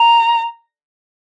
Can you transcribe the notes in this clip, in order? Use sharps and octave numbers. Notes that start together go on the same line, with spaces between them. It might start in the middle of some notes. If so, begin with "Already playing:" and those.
Already playing: A#5